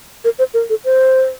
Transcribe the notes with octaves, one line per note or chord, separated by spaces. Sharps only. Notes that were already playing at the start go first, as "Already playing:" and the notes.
A#4
C5
A#4
A4
C5